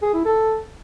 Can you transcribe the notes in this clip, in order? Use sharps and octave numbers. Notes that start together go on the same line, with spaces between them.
G#4
E4
A4